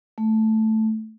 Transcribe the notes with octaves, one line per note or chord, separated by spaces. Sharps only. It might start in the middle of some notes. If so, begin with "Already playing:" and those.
A3